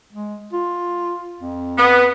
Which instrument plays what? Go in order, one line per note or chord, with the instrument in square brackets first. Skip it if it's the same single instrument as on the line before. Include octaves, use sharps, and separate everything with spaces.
[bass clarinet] G#3
F4
F2
[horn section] B3